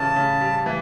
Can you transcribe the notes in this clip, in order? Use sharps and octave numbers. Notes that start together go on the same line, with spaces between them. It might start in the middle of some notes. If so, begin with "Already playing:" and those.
Already playing: C#3 E3 G3 A5
C#3
G3
E3